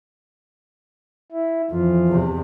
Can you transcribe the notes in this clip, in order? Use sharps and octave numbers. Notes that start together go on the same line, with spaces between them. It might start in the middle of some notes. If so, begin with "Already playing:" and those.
E4
F2 E3 F3 F4
E2 C3